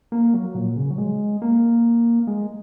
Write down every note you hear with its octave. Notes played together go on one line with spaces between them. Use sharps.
A#3
F#3
A#2
C#3
F#3
G#3
A#3
G#3